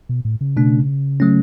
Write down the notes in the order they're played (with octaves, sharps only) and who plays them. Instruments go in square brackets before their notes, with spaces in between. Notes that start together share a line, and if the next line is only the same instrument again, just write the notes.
[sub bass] B2
A2
C#3
[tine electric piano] B2 A3 D4
F#3 A3 C#4